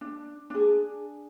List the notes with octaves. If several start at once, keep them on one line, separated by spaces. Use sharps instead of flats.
D4
D4 G#4